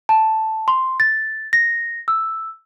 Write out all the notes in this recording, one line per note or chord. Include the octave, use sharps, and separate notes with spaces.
A5
C6
A6
A#6
E6